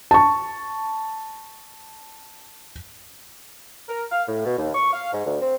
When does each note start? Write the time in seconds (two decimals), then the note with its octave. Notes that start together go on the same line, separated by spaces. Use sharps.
0.11 A5 C#6
3.89 A#4
4.12 F5
4.28 A2
4.45 B2
4.58 D#2
4.75 C#6
4.93 F5
5.13 G#2
5.26 D2
5.41 C4